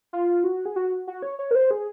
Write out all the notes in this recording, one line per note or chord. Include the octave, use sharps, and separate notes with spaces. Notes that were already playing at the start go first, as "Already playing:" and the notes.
F4
F#4
G#4
F#4
F#4
C#5
C#5
A#4
C5
G#4